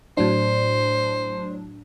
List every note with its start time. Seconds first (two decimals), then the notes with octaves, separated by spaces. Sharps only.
0.17 A2 F#3 D4 C5